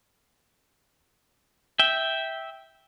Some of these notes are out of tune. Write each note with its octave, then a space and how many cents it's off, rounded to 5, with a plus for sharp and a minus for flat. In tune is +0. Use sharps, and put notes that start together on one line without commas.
E5 -10 G5 +0